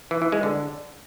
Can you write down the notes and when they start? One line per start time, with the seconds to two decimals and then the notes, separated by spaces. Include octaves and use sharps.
0.11 E3
0.22 E3
0.32 G#3
0.43 D3